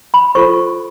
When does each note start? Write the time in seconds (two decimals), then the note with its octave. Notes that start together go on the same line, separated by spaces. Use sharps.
0.14 B5
0.35 F4 A4 C5 C#6